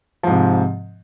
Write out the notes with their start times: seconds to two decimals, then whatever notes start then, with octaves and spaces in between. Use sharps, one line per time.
0.23 F3
0.27 G#2
0.30 C3